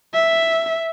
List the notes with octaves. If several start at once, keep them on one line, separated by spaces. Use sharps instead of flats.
E5